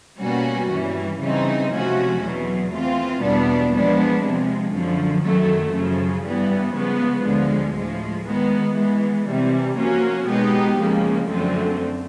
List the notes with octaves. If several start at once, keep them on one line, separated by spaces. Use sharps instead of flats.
B2 G3 A#3 C#4 F#4
G2 E3 G3
C#3 E3 G3 C4 D#4
C3 F3 A3 C#4 F#4
E2 B2 F#3
E3 A3 C4 F4
E2 B2 G3 B3 D4
F3 G#3 B3 D4
C3 F3 G#3
F#2 D3 F3
F#2 D#3 F#3 A3
F#2 C#3 F3
G2 E3 G3 B3
C#3 F3 G#3 B3
D2 D3 F3 G#3
A2 F3 G#3
D#3 G#3 B3
E3 G#3 B3
C3 E3 G3
F3 A#3 C#4 F#4 A#4
B2 G#3 B3 D#4 G4
C#2 C#3 F3 A#3
F#2 D3 F3 A3 C4